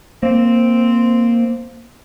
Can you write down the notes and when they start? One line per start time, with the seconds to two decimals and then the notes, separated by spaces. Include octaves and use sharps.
0.23 A#3 C4